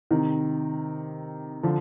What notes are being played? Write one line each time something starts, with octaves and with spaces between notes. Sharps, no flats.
C3 D#3
D3 F3